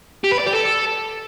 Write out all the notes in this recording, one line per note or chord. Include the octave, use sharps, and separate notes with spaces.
G4
B4
D5
G4
A4